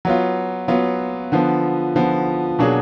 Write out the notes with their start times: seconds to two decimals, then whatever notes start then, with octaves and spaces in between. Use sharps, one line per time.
0.05 F#3 B3 F4
0.68 F#3 B3 F4
1.32 D3 F3 B3
1.95 D3 F3 B3
2.59 B2 F#3 A#3 D4 G#4